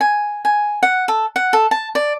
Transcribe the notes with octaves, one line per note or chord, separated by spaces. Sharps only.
G#5
G#5
F#5
A4
F#5
A4
A5
D5